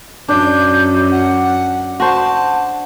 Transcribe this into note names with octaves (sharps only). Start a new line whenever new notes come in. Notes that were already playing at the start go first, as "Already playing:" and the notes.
F#2 D4 G6
F#5
F#4 C5 A5